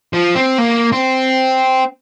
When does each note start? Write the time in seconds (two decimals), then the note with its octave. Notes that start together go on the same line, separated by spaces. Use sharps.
0.13 F3
0.35 C4
0.58 A#3
0.93 C4